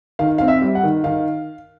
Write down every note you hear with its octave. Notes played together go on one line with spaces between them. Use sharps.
D#3 F5
C4 F5
E5
G3
F#5
D#3
D#3 F5